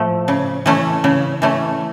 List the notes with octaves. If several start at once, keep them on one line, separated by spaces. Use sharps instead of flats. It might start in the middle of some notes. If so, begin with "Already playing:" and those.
Already playing: A2 F3 A3
C#3
E3 A3 C#4
C#3
E3 A3 C#4